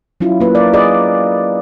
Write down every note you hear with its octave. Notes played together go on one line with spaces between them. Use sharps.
F#3 C#4 E4 F4
A#3 B4
A#4 D5
G#4 D5 D#5